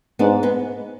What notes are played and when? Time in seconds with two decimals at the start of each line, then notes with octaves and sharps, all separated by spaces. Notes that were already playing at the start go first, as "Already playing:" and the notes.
0.19 G#2 B3 D4
0.43 G#3 B3